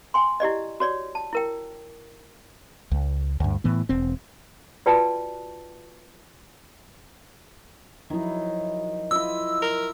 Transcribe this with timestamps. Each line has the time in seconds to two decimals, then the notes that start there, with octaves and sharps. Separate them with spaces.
0.14 G5 G#5 C6
0.40 E4 G4 D5 D#5
0.80 F#4 C#5 D5
1.15 A5
1.33 E4 A#4 G5
2.91 C#2
3.40 D2 G2
3.64 A2 E3 B3
3.89 E1 C4
4.86 F4 F#4 B4 D5 G5 A5
8.10 D#3 F3 F#3 D#4 E4
9.11 E4 F4 D#5 E6
9.62 A#4